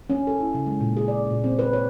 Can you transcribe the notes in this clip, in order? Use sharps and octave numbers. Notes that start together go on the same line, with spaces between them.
C#4
A4
E4
C#3
G#3
A#2
G#4
D5
A#2
C4
B4
C#5